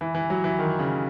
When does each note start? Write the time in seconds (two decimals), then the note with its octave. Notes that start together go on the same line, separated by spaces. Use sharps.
0.01 E3
0.15 E3
0.30 F#3
0.44 E3
0.59 D#3
0.79 C#3